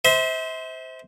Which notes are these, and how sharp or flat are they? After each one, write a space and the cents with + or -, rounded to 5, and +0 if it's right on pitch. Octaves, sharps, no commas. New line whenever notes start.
C5 -10 E5 -40